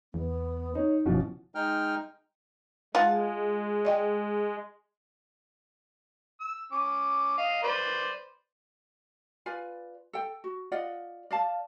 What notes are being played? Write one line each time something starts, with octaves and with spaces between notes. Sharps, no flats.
E2 B3
D#4 C#5
F#1 B2 E3 F3 C#4
G#3 D#4 G5 F6
G#3 F4 F#5 A5
D5 D#5 G5
E6
C#4 D6
D#5 F5
B4 C5 D5
F4 B4 D5 G#5
A4 G5
F#4
F4 D5 D#5 F#5
D5 F5 A5